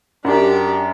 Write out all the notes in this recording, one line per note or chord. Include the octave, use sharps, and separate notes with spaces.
F#2 D4 G4